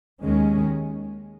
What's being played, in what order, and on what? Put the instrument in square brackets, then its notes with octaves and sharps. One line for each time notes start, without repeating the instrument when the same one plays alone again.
[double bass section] D#2 D#3 G#3 C#4